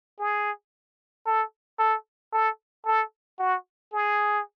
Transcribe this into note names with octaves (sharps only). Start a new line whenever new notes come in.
G#4
A4
A4
A4
A4
F#4
G#4